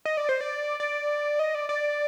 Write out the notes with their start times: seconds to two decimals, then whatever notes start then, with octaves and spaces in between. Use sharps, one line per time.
0.05 D#5
0.17 D5
0.29 C5
0.41 D5
0.80 D5
1.39 D#5
1.55 D5
1.69 D5